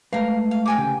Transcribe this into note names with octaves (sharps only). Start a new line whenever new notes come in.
G#3 A3 A#4 B4 F5
F5
G5 G#5 D6
D2 C#3 G4